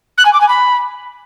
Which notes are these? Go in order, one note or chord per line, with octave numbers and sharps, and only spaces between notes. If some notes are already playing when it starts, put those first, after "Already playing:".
F#6
G#5
D6
G#5
B5